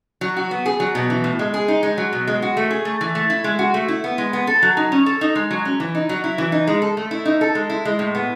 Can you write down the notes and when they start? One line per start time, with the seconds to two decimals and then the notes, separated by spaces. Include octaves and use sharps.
0.21 F#3
0.37 F#4
0.51 B3
0.66 G#4
0.80 F#3
0.95 B2
1.10 E3
1.24 A2
1.39 G#3
1.54 G#4
1.68 D#4
1.83 G#3
1.98 F#3
2.13 B2
2.27 G#3
2.42 F#4
2.57 A3
2.71 G#4
2.85 A3
3.01 E3
3.15 A3
3.30 E4
3.44 G#3
3.59 F#4
3.74 A3
3.88 E4
4.04 B3
4.18 G#3
4.33 B3
4.47 A4
4.62 F#3
4.77 D#4
4.92 C#4
5.06 A4
5.21 D#4
5.36 G#3
5.51 F#3
5.65 C#4
5.80 E3
5.95 D#4
6.09 F#3
6.24 E4
6.38 E3
6.52 D#4
6.67 G#3
6.82 A4
6.97 A3
7.11 E4
7.26 D#4
7.41 A4
7.55 G#3
7.70 E4
7.85 G#3
7.99 A2
8.15 B3